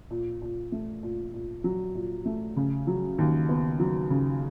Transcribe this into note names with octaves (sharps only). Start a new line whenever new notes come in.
A#2
A#2
A3
A#2
A#2
F#3
A#2
A3
C#3
F#3
D#2
B3
F#3
C#3